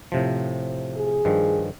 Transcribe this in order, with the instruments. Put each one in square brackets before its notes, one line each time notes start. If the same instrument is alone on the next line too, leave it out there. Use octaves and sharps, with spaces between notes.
[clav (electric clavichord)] A2 C3 F3
[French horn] G#4
[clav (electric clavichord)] G2 D#3 F3